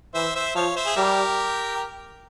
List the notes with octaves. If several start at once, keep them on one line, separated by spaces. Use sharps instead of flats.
E3 C5 E5
C5 E5
F3 C#5 F5
C5 E5
G#4
G3 G4 A#4